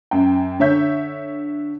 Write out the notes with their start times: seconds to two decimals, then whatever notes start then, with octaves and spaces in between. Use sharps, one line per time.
0.11 F#2 G5
0.60 D3 C#5 E5 G6